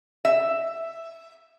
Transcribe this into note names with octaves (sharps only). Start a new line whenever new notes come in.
E5